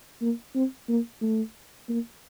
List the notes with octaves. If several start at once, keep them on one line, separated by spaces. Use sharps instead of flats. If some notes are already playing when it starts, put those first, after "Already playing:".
A#3
C4
A#3
A3
A#3